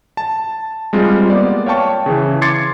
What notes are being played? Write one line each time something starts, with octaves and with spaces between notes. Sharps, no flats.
A5
G3 G#3 C4 F4
A#3 B3 D5
C#5 F5 G5 A5 C#6
C#3 E3
C6 D6 G#6 A6 C7 C#7